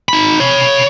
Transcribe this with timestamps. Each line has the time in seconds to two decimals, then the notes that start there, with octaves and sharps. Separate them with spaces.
0.09 D#4 B5
0.40 C#5 B5